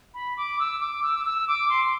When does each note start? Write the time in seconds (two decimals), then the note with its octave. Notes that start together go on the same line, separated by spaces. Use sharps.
0.14 B5
0.37 D6
0.59 E6
0.80 D6
1.03 E6
1.25 E6
1.48 D6
1.69 C6